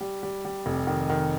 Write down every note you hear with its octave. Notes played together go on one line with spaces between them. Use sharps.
G3
G3
G3
F1
D#3
D#3